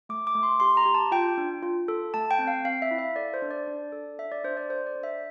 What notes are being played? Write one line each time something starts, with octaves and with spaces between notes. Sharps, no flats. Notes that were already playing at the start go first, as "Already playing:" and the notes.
A3 D6
D6
A3
C6
G4 C6
A#5
G4
A5
F4 G5
D4
F4
A4
A3 A5
G5
C4
F5
C4 F5
E5
E4
E5
A4 D5
C5
D4
D5
D4
A4
D4 E5
D5
D4 C5
D5
A4 C5
D5
D4
E5